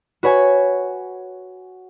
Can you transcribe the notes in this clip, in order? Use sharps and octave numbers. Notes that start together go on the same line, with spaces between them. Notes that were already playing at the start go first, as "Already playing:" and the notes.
F#4 B4 C#5 G#5